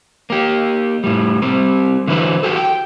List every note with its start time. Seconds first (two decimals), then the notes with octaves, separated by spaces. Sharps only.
0.30 A#3 G4
1.04 A2 G3
1.42 G3 C4
2.08 D3 E3 F#3 B4 C5
2.43 F#4 G4 A4
2.56 G5